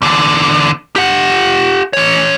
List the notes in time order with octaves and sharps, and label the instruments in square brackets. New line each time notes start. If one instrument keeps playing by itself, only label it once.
[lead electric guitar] E2 D3
G4 F#5
E3 C#5